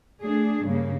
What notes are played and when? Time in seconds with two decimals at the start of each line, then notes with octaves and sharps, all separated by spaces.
0.22 A3 D4 G#4
0.66 G2 C#3 A#3